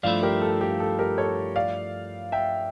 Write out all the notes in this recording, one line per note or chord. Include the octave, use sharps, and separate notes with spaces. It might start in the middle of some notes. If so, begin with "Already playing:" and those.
G2 F3 A3 E4 D5 F5
G4 A#4
A4
G4
A4
G4 A#4
A4 C#5
D5 F5
E5 G5